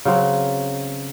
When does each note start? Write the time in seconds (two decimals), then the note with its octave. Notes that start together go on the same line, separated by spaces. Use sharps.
0.05 C#3 F#3 C4